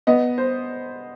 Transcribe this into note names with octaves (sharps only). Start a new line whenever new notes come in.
B3 D#5
C5